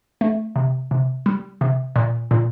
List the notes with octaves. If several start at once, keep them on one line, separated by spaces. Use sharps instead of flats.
A3
C3
C3
G3
C3
A#2
A#2